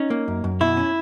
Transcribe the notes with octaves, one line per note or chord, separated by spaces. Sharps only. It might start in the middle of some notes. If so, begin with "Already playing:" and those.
Already playing: C#4 D#4
A#3
F#2
F#2
B2 E4
C#4